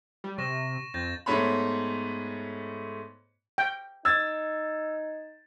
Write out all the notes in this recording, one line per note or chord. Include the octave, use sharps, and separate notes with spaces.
G3
C3 C#6 A#6 E7
F2 G6 A6 A#6
G#2 A3 B3 C#5 B5
G5
D#4 E6 G#6 A6